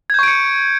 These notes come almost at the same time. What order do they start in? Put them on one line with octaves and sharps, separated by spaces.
G#6 G6 C#6 D7 C#7